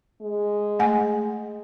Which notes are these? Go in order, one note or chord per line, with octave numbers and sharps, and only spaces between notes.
G#3
A3 F#5 G#5